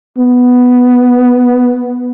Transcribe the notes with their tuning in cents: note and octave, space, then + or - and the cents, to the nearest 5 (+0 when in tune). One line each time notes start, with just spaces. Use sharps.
B3 +0